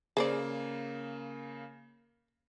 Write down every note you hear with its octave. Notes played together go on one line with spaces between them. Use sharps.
C#3 A#3 G#4 C5 D5